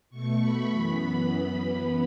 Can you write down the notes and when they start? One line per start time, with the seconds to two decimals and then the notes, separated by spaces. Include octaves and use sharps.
0.10 B2 A3 C#6
0.39 B5
0.69 F#2 E3 B3